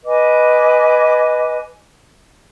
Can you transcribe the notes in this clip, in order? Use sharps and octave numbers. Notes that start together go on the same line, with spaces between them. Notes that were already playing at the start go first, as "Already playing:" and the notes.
B4 D#5 G#5 D6